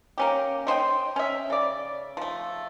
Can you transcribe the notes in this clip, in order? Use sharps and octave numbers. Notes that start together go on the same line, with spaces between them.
A#3 C#4 G4
A3 C5 D#5 G5
C#4 E5
C#3 D5
F3 A3